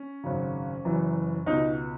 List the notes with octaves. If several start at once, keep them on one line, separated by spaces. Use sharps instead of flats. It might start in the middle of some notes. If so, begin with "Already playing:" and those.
Already playing: C#4
G#1 F#2 C#3
F#1 F#2 E3
C#2 B2 D#4